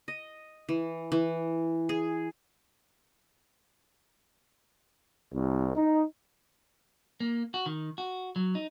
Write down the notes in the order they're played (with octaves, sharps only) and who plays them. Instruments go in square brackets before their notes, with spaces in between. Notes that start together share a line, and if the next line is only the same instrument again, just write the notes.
[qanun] D#5
E3
E3
G#4
[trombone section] C2
D#4
[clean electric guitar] A#3
F#4
D#3
F#4
F#3
D#4